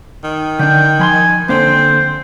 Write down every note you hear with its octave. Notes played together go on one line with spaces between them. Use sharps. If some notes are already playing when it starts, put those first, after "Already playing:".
D#3
D3 D4 G5
F3 G#5 B5 C6
D3 A#3 C4 C5